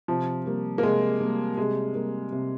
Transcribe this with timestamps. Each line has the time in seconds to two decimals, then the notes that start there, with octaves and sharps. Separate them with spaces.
0.08 C3 F3
0.46 G3 A#3
0.78 A#3
0.83 C3 G#3
1.21 G3 A#3
1.57 C3 G#3
1.95 G3 A#3
2.32 C3